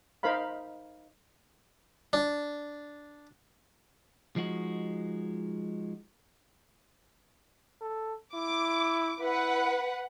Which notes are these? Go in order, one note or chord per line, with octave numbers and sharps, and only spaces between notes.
D#4 A#4 C5 F5 B5
D4
F3 G#3 D#4 F#4
A4
E4 D6
E4 B4 F#5